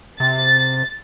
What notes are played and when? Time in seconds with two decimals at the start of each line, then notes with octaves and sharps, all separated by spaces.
0.20 C3 A6